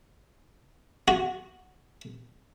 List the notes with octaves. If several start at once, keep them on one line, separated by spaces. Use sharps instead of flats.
F#4